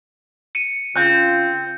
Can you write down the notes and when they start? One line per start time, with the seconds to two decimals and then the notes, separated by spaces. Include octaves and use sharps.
0.55 C#7 D#7
0.96 C#3 C4 F4 F#6 G6